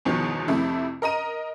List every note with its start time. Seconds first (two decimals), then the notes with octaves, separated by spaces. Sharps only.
0.05 G1 E2 B2 D#3 F3
0.48 F2 C3 A3 E4
1.02 A#4 D#5 A#5 D#7